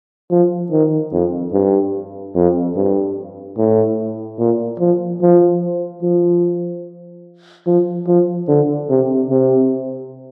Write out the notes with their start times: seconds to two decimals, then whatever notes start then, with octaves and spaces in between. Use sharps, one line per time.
0.31 F3
0.71 D#3
1.12 F2
1.53 G2
2.35 F2
2.76 G2
3.58 A2
4.39 A#2
4.80 F3
5.22 F3
6.02 F3
7.67 F3
8.07 F3
8.48 D3
8.90 C3
9.30 C3